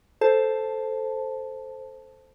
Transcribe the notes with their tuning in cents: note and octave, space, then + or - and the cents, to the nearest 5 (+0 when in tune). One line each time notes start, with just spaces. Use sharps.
A4 +0 C5 +0 A5 +0